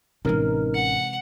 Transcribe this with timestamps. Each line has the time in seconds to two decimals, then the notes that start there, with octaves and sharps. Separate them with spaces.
0.25 A1 C3 E3 G#3 C#4 D#4 A#4 F6
0.74 F#5 C#7